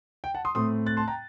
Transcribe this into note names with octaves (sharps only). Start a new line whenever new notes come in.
G5
F#5 A5
C6 D#6
A2 A3 C4 C6 D#6
F#6 A6
A5 C6
G5 A#5